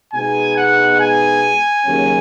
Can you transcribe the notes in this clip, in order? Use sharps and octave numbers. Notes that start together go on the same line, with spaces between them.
B2 G#3 B3 D#4 G#5
F#5
G#5
D#2 C#3 F#3 C#4